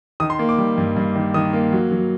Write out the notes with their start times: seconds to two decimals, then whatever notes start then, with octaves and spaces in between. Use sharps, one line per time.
0.20 D#3 D#6
0.30 C6
0.39 A#3
0.49 D6
0.58 G3
0.78 G2
0.97 G2
1.15 D#3
1.34 D#3 D#6
1.53 A#3
1.72 F#3
1.92 F#3